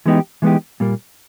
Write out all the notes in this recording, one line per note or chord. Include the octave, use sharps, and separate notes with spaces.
E3 G#3 B3 D#4 G4
E3 G#3 B3 D#4 G4
A#2 G3 A#3